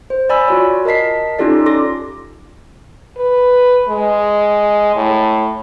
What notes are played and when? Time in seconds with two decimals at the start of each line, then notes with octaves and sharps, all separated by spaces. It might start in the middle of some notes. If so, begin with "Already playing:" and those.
0.10 C5
0.30 D5 G#5 B5 E6
0.48 F4 F#4 C#5
0.85 A#4 D#5 A5 B6 C7
1.39 C#4 D#4 F4 G4 A4 D5
1.66 A4 C6 D6 A#6
3.17 B4
3.89 G#3
4.96 A2